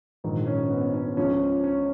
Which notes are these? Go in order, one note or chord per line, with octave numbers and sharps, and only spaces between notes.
A#1 G#2 D#3
C#4
B3
C#4
C#2 C#3 F3 C#4
C#4